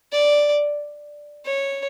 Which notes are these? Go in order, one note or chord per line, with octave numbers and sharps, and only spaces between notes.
D5
C#5